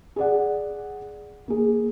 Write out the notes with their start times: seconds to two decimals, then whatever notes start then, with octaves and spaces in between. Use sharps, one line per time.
0.16 G#4 D5 F#5
1.48 A#3 G#4